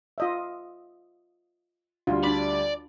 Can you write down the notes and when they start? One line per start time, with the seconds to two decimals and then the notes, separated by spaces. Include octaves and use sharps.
0.18 F4 D#5 E5
2.07 D2 G3 F4
2.23 D4 D5 B5